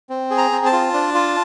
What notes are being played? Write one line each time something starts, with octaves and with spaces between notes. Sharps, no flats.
C4
G#4
A#5
C4
A5
F4
D4
F4